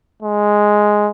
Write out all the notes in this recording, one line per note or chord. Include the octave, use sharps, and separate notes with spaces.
G#3